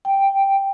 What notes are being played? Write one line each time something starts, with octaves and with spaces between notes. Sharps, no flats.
G5